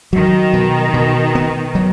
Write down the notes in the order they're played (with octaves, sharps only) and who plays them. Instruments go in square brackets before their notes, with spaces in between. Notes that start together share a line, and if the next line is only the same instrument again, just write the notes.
[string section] D#3 [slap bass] F#3
[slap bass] B2
B2
B3
F#3